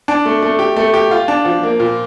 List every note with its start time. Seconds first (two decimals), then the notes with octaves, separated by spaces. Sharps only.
0.08 D4
0.25 A3
0.42 A3
0.59 G4
0.77 A3
0.94 G4
1.11 F4
1.28 D4
1.45 F3
1.63 A#3
1.80 A#2